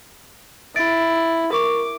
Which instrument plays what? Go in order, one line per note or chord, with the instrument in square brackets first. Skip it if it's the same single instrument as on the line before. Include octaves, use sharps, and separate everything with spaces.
[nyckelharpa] E4 [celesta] A6 D7
[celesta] A#4 C#6 [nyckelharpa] D6